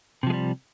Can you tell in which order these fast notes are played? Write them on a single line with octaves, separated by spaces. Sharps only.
C3 F3 G#3 G3